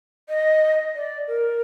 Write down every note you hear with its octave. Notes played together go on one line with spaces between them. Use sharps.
D#5
D5
A#4